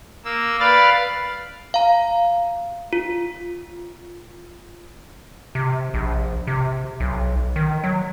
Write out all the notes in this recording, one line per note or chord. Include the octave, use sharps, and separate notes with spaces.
A#3 E6
B4 D5 F5 B5 F6 A6
F5 A#5
F4
C3
A#1
C3
B1
D#3
F#3